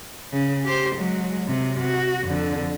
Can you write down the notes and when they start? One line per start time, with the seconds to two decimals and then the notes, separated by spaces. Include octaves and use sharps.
0.32 C#3
0.65 G4 C5
0.96 F#3 G#3
1.47 C3 F#3
1.80 F#4
2.23 F2 D3